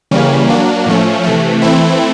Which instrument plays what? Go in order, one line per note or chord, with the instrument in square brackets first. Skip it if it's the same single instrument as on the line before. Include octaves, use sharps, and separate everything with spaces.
[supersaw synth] C#3 E3 G3 A#3 C#4
F#3 A#3 D4
A2 F3 A3 C#4
C3 E3 A3
E3 A3 C4 E4